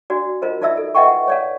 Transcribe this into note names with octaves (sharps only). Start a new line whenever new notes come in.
D4 F#4 D5
F4 A#4 C5 D#5
D#4 F4 D5 E5 E6
A4
B4 D#5 E5 F#5 G5 C#6
C#5 D5 F5